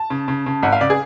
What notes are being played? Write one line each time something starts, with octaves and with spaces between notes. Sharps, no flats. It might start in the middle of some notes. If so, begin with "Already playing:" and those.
Already playing: A5
C#3
C#3
C#3
G#1 F#5
F5
C#3 D5
G#4